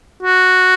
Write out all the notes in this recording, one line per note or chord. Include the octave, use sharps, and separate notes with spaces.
F#4